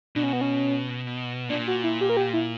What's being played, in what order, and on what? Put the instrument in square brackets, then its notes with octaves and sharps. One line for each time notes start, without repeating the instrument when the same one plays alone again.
[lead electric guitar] B2 [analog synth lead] D4
[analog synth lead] C#4
B3
C#4
[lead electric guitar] A#2 [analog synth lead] D4
[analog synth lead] F#4
E4
G4
A#4
G4
E4